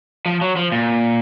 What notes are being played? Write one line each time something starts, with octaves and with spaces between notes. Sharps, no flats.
F3
F#3
F3
A#2